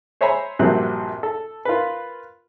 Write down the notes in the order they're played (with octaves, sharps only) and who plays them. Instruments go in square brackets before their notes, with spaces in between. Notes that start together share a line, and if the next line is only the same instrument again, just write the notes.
[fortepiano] C5 C#5 E5 G#5 A#5 B5
A#1 G2 C3 F#3 C4 F#6
A4
F4 A#4 B4